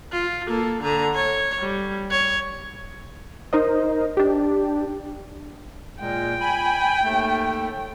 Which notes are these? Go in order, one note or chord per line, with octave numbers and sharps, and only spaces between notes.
F4
A#3 A4
D3 A#5
C#5
G3
C#5
D#4 A#4 C5 D#5
D4 G4
A#2 G#3 G5
G#5 B5
D#2 A3